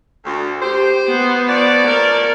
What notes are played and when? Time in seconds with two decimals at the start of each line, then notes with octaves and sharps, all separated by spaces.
0.25 D2
0.61 G4 C5
1.07 B3
1.48 F3 C#5 D5
1.86 A#4